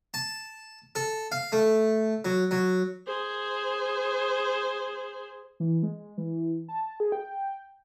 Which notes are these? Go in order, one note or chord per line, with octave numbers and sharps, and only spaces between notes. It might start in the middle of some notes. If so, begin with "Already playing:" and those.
A5
A4
F5
A3
F#3
F#3
G#4 C5
E3
G#3
E3
A5
G#4
G5